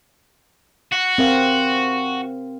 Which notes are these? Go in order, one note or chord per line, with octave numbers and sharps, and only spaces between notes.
F#4
C4 A#4 F5